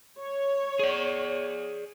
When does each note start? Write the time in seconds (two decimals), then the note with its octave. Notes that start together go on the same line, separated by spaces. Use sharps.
0.19 C#5
0.79 G#4 D5